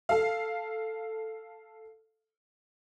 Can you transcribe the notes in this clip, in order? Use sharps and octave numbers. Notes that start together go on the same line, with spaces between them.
A4 F5